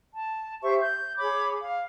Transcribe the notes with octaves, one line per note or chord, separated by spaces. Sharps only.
A5
G4 C5 E5 C#6
G6
G#4 C#5 B5 D6
F5